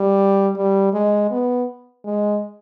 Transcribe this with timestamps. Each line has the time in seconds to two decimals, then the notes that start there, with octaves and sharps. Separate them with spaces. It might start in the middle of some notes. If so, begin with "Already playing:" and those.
Already playing: G3
0.57 G3
0.93 G#3
1.31 B3
2.05 G#3